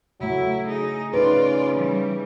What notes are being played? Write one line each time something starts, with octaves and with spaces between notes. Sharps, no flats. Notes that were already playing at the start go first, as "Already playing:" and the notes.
C#3 F#3 A3 E4
D#4 G#4
C#3 D#4 F4 B4 D5
E3 G3